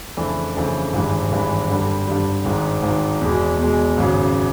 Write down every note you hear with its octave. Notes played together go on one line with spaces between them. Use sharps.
F2 C#3 E3 A3 D4
F2 C#3 E3 A3 D4
G#1 G2 E3 G#3
G#1 G2 E3 G#3
G2 D3 G3
G2 D3 G3
G#1 G#2 D#3
G#1 G#2 D#3
E2 B2 G#3
E2 B2 G#3
G#1 F#2 C#3